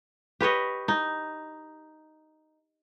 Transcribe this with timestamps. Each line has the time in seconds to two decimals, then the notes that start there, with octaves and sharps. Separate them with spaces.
0.41 G4 B4 C#5 D#5
0.88 D#4